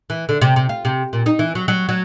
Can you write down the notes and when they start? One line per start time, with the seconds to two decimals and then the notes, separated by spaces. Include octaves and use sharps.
0.10 E3
0.29 D3
0.42 C3
0.56 C3
0.69 F4
0.85 C3
1.13 A#2
1.26 D#4
1.39 E3
1.55 F#3
1.68 F#3
1.89 F#3